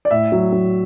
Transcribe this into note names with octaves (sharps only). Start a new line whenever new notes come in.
D5
A2 E5
F#3
F#3